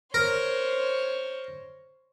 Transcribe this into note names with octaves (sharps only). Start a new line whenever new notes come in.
A#4 C5 C#5